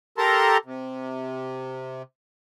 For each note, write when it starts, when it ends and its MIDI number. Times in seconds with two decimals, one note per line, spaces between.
0.18 0.57 67
0.18 0.57 69
0.18 0.57 70
0.18 0.57 81
0.18 0.57 82
0.18 0.57 84
0.65 2.02 48